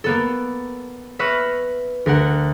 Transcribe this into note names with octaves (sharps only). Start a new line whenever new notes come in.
A#3 B3 A4
B4 E5 C#6 F6 F#6 A#6
D2 A#4 F#5